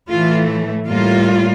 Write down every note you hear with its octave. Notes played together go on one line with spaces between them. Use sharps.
A2 E3 A3 F4
A2 G3 A#3 F4